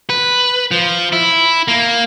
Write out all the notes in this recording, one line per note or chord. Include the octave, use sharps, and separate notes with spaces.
B4
F3
E4
A#3